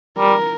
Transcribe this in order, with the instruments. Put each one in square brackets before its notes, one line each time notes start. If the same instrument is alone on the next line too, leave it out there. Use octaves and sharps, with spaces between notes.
[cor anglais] G3 [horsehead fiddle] A#4